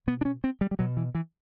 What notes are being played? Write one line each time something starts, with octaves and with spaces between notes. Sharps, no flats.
B2 B3
D4
C#4
C4
G3
G3
B2 F#3
E3
E3